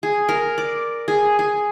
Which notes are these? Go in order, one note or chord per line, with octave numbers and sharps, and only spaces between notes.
G#4
A#4
D5
G#4
G#4